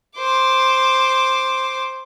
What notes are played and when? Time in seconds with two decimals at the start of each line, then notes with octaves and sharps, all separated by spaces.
0.18 C5 D6